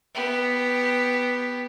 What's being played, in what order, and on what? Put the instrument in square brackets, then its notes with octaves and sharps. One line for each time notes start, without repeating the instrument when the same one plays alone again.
[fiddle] B3 G4